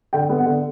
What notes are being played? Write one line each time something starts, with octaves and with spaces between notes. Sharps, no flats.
D3 G5
B3
F#5
D3